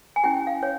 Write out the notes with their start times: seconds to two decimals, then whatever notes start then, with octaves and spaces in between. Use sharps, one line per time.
0.16 G#5
0.23 C#4 E4 G4 G5
0.47 F5
0.63 C#5